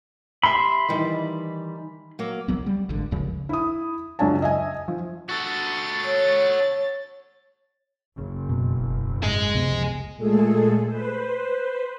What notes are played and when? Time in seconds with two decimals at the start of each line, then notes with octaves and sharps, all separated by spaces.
0.44 G4 E5 B5 C6
0.89 D#3 E3 G3
2.19 F#3 A#3
2.48 C2 F#3 B3
2.66 G3
2.89 G#1 D3
3.11 G#1 D#2 C#3 F3
3.49 E4 D#6
4.19 C#2 F#2 D4 G#5 A5
4.42 D#5 E5 G#5
4.88 F3
5.29 F#4 A4 A6
6.05 C#5
8.18 F#1 C#3
8.49 F#2 B2
8.80 E1
9.23 G#2 G#4 D#5
9.54 C#2 C3 F3 B3
10.17 A#2 G#3 A3 G#4 A4
10.85 B4 C5